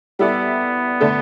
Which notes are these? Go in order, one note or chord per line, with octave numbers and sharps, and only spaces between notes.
G3 B3 E4 A4 D5
D3 A3 D4 A4